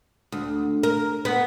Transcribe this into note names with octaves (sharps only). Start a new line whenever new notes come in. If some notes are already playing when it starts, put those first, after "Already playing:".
D2
A#4
B3